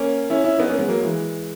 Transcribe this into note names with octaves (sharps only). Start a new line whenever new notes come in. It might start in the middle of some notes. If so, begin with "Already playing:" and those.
Already playing: A#3 C#4
C#4 E4
C#4 E4
B3 D#4
A#3 C#4
G#3 B3
F#3 A#3
E3 G#3